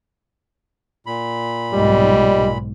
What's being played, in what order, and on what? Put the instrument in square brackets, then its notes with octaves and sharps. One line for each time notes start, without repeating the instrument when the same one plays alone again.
[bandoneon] A#2 B5
[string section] B1 G#2 [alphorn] G3 [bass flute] D#5